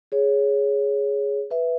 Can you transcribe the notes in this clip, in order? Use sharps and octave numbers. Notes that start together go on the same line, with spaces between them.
G#4 C#5
B4 E5